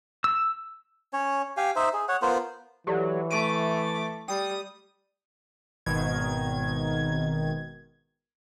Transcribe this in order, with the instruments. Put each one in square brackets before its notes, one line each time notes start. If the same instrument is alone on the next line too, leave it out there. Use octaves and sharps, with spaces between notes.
[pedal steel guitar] E6
[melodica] C#4 C#5
G4 F5 G#5
D#4 C5 E5
G#4
C#5 F#5
B3 F4 A#4 C5
[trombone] E3 [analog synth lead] F#3 [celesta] G4 A4 D5
[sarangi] A3 [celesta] C#6 D7 D#7 [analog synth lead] D6
[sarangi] G3 [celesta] G5 [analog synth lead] D#6
[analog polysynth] G#1 B2 D#3 G#6